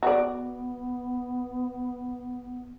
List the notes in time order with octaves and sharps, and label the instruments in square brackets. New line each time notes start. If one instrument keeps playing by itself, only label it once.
[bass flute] B3 [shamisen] F#4 D5